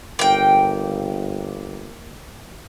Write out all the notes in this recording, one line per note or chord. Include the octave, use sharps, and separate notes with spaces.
G1 A#3 G5